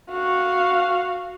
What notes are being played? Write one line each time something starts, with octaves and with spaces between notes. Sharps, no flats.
F#4 F5